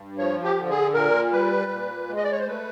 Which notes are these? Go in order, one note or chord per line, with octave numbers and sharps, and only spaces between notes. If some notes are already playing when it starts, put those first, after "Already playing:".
Already playing: G2
F3 C#5
G4
D3
G#4
A#2 A#4
G3 B4
A#2
G#3
D#5
D5
C#5
C5
A3 B4